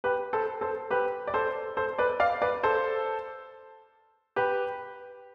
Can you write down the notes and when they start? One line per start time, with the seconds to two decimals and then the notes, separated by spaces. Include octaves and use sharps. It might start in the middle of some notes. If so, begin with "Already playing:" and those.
0.04 G4 B4
0.33 A4 C5
0.61 A4 C5
0.90 G4 B4
1.27 D5
1.34 A4 C5
1.77 A4 C5
1.98 B4 D5
2.20 D5 F5
2.42 B4 D5
2.63 A4 C5
4.36 G4 B4